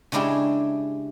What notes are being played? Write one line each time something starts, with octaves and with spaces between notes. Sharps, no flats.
C#3 G#3 D4 E4 G4 G#4